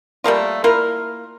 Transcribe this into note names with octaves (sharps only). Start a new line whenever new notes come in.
G3 A3 A#3 F4
A#3 E4 F4 A#4